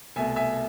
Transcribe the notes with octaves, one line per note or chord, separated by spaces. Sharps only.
C2 B2 A3 E5 G#5
E5 G#5